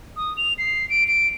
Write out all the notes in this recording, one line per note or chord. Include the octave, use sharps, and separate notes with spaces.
D#6
F7
C7
D7
D7